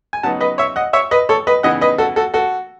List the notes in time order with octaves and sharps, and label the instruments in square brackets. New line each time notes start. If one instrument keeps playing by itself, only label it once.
[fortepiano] G#5
C#3 F#3 B3 D#4 F#5 A5
B4 D#5
C#5 E5
D#5 F#5
C#5 E5
B4 D#5
A4 C#5
B4 D#5
C#3 E3 B3 D#4 D#5 F#5
B4 D#5
F#4 A4
F#4 A4
F#4 A4